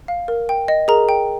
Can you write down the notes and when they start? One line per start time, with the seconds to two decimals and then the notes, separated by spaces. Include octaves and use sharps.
0.08 F5
0.28 A#4
0.49 G5
0.68 D#5
0.88 G#4 A#4 A#5
1.09 G5